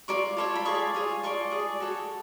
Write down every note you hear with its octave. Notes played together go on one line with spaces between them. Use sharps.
F4 A4 D5 C#6
F4 A4 C#5
B5
F4 G#4 D5 C#6
F4 G#4 C#5
F4 A4 D5 C#6
G#4 D5
F#4 A4 C#5